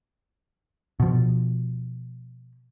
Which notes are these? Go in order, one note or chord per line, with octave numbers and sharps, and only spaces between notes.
B2 F3